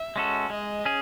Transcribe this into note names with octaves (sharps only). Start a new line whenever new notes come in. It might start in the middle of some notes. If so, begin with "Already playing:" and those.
Already playing: E5
G#3 C#4 F#4 A4
G#3 D#5
C#4 G#4